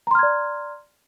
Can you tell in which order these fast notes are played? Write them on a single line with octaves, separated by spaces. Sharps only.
A#5 C6 F6 G#6 D5